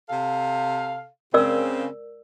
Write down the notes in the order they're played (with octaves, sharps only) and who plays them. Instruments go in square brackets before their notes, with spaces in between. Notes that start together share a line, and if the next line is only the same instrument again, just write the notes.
[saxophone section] C3 A4 F5
[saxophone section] C#3 C4 [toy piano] A#4 D5 E6